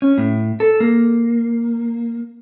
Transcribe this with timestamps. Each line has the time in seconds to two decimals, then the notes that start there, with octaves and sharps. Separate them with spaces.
0.02 C#4
0.18 A2
0.60 A4
0.80 A#3